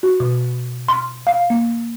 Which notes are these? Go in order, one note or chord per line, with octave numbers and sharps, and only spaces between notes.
F#4
B2
C6
F5
A#3